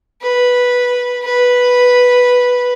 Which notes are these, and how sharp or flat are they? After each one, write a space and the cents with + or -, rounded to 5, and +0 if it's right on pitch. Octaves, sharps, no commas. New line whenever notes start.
B4 -5
B4 -5